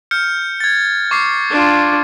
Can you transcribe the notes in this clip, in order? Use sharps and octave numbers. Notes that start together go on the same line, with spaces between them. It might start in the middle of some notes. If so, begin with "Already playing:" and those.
F6 G6 C#7
G#6 A6
C#6 D6 C7
D4 F4